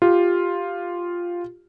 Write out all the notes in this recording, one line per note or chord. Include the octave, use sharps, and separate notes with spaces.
F4 G4